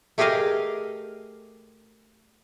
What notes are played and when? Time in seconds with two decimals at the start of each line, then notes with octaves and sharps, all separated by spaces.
0.18 A3 G4 G#4 A#4 D#5 F5